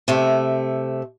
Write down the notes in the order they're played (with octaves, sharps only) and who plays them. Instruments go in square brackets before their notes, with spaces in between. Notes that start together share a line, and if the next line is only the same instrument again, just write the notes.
[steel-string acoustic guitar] C3 A3